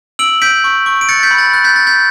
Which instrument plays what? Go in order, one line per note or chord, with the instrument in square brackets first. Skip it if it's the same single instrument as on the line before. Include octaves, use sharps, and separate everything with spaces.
[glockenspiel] E6 D7 F#7
G6 B6 D7
C#6
C#6
D7
F#6 A6 C#7
G6 B6
B5
A6
F#6 A6
G6 B6
F#6 A6
G6 B6